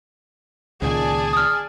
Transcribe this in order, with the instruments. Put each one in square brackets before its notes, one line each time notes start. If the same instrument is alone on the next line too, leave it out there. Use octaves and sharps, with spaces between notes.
[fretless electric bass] C#2 A#2 D#3 [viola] G#4 [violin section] D5 G#5 A5
[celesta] D#6 F6